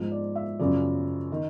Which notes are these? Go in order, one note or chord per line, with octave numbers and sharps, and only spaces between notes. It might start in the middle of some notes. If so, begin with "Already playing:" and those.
Already playing: G#2 F3
D5
E5
F#2 C#3 F3 D5
D#3